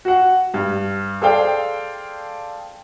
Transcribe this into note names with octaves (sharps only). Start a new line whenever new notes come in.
F#4 F#5
G2
G#4 A4 C5 D5 F5 G5